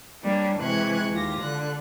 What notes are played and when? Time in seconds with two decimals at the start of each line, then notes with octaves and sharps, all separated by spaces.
0.23 F#3 G3 A#3 D4
0.61 C3 E3 G#3 C#6 F#6 G#6
1.12 D#2 F4 G4 A#6
1.42 D3 F#6